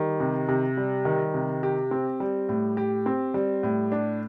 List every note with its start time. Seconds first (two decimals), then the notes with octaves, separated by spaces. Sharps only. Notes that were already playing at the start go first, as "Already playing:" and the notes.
Already playing: D#3 G3
0.20 C3
0.49 C3
0.77 G3
1.05 D#3
1.34 C3
1.63 G4
1.91 C4
2.20 G3
2.49 A2
2.77 G4
3.06 C4
3.34 G3
3.63 A2
3.92 D4